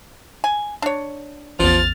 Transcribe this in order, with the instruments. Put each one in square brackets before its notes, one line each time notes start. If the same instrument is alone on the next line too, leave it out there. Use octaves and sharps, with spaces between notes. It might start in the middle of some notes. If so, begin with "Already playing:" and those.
[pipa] G#5
D4 C#5
[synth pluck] A1 E2 [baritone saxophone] F3 [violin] F6 A6